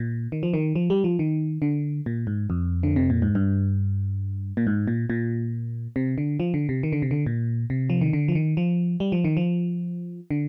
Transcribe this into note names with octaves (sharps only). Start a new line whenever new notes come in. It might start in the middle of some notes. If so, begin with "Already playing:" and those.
Already playing: A#2
D#3
F3
D#3
F3
G3
F3
D#3
D3
A#2
G#2
F2
D3
C3
A#2
G#2
G2
A#2
G#2
A#2
A#2
C3
D3
F3
D3
C3
D#3
D3
C3
D3
A#2
C3
F3
D#3
D3
F3
D#3
F3
G3
F3
D#3
F3
D3